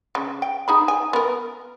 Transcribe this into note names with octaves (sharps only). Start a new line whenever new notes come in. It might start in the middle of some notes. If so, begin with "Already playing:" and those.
C#3
G5
D#4 G#4 B5
G#5
B3 A#4